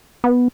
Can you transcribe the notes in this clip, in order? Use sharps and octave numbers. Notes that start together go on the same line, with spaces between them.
B3